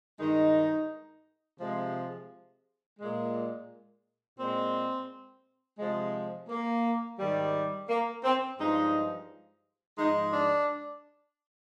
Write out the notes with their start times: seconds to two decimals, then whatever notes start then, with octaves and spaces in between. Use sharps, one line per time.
0.19 G2 D#3 G#3 D#4
1.59 C3 F3 G#3
2.99 A#2 G#3
4.38 A#2 G#3 C4
5.79 C3 F3 G#3
6.49 A#3
7.19 G#2 D#3 G3
7.89 A#3
8.24 C4
8.58 G2 F3 G#3 D#4
9.98 G#2 F3 G#3 D#4
10.33 D4